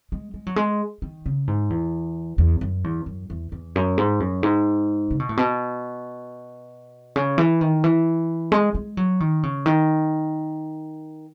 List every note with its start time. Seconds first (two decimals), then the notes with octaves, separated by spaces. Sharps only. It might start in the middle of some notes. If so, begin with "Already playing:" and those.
0.12 G#3
0.34 G#3
0.47 F#3
0.56 G#3
1.02 D#3
1.26 C#3
1.48 G#2
1.70 E2
2.38 E2
2.61 F#2
2.84 E2
3.06 F#2
3.30 E2
3.52 E2
3.75 F#2
3.98 G#2
4.20 F#2
4.43 G#2
5.11 C#3
5.20 B2
5.29 A2
5.37 B2
7.16 C#3
7.38 E3
7.61 D#3
7.84 E3
8.52 G#3
8.75 G#3
8.97 F#3
9.20 D#3
9.43 C#3
9.66 D#3